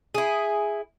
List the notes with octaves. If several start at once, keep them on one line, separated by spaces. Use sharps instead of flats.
E4 G#4